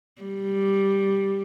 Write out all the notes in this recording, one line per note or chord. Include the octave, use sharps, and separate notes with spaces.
G3